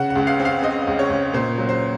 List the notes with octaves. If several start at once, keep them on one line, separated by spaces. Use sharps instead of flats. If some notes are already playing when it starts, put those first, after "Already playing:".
Already playing: C#3 F#5
F#5
C#2
F5
C4
F5
C4 D#5
C#2
C#5
C#2
A#2 C5
F#3
C5